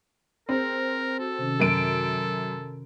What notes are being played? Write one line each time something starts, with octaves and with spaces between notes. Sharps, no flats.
C4 G#4 A#4
F#4 A4
C3 D#3 C#4
F#2 D7